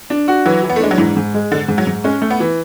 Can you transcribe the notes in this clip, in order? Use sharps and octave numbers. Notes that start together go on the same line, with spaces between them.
D4
F#4
E3 F#3
E3
B3
A3
G#3 D4
F#3
G#2 E3
G#2
G#3
G#2 D3
G#2
F#3
G#2
G#3 C#4
A3
B3
E3